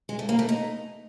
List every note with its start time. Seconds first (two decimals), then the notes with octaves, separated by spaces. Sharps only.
0.09 G#3
0.19 A3
0.29 A#3
0.39 A3
0.49 D#4